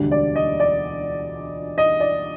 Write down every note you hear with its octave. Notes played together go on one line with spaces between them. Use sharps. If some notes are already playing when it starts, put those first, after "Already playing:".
Already playing: E1 D2 D3 G3
D5
D#5
D5
D#5
D5